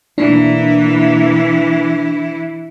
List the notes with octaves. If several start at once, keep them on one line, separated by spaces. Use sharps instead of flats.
B2 E3 A#3 D4 E4